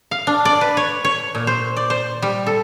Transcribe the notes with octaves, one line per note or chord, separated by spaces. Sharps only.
F5
D4
D5
B4
C#5
C#5
A#2
C5
D5
C5
G3
A4